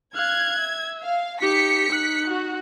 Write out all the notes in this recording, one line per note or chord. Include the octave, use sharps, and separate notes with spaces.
F5 F#6 G#6
E5
F5
D#4 G4 B6 C#7
D#4 F#6
F#4